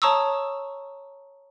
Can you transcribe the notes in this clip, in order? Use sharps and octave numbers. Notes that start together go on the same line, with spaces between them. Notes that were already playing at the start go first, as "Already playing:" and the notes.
C#5 A5 A#5 C#6 D#6 E6